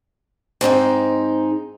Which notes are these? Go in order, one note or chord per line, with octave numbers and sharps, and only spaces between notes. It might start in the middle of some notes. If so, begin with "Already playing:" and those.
G#2 C4 D4 D#4